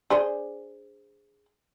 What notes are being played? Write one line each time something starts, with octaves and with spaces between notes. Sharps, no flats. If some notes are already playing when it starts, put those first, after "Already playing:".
D4 G#4 C5